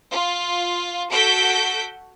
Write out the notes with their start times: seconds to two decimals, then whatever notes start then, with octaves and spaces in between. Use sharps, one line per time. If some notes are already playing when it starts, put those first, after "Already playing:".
0.11 F4
1.11 F#4 A4 G6 B6 D7